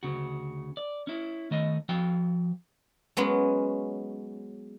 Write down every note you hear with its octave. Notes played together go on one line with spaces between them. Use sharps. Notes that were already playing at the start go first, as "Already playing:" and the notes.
D2 C#3 F#4
D5
C#4 E4
D#3 A3 D#5
F3 F#4 F5 G5
F#3 G#3 B3 C#4